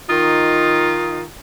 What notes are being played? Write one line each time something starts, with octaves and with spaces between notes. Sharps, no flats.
D#3 D#4 F4